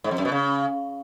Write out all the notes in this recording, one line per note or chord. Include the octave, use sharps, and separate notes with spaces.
G#2
F2
F#2
B2
C#3